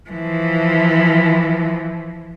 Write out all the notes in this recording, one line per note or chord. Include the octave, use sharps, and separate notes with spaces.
E3 F3